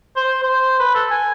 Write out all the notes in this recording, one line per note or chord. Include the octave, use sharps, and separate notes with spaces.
C5
C5
B4
A4
G#5